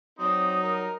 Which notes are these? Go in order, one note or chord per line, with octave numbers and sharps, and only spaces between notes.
F#3 C4 D#4 C5 D5 D#6
G3 A#4